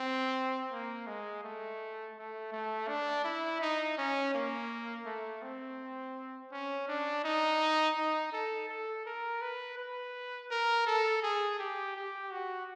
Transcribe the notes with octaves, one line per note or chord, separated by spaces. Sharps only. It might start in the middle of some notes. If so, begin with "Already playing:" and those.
Already playing: C4
A#3
G#3
A3
A3
A3
D4
E4
D#4
C#4
A#3
A3
C4
C#4
D4
D#4
D#4
A4
A4
A#4
B4
B4
A#4
A4
G#4
G4
G4
F#4